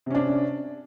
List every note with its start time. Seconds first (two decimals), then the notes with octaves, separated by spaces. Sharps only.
0.06 C3
0.10 C#4
0.15 D4